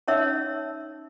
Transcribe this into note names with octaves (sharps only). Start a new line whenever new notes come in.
C#4 D#4 C#5 E5 E6